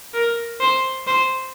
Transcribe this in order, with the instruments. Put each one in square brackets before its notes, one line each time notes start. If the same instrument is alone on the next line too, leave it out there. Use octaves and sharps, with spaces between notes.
[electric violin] A#4
C5
C5